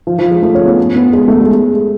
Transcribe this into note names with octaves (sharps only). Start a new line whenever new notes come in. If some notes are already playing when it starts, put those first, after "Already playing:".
F3
F3
G#3
A3
C#4
B3
C#4
B3
G#3
A3
G#3